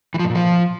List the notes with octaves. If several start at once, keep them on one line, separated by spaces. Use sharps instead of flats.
E3
F3
G#2
A#2
F3